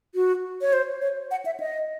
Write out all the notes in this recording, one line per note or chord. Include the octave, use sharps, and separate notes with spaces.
F#4
C#5
C5
C#5
F#5
E5
D#5